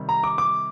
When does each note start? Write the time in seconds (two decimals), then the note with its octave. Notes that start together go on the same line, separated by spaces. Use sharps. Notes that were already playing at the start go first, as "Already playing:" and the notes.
Already playing: C3 D#3 G3
0.09 A#5
0.24 D6
0.38 D6